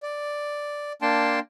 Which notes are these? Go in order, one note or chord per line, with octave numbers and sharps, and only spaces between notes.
D5
A#3 D4 G5 A5 C6